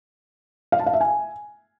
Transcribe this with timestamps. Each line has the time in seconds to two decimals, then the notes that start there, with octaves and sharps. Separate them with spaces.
0.72 F5
0.79 A5
0.86 F5
0.94 E5
1.01 G#5